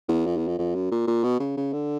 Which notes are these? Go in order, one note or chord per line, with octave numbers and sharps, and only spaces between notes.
E2
F2
E2
F2
F2
F#2
A#2
A#2
B2
C#3
C#3
D3